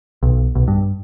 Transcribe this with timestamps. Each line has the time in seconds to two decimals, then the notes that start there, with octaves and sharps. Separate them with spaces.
0.23 B1
0.55 B1
0.68 G2